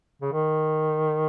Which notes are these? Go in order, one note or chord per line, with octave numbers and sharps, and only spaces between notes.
C#3
D#3